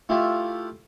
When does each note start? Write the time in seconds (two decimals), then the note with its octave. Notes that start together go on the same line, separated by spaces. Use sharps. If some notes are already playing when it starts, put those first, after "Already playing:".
0.09 A3 E4 F4 G4